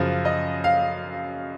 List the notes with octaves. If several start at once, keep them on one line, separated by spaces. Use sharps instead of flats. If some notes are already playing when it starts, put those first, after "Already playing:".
Already playing: F#2 C#3 F3
D#5
F5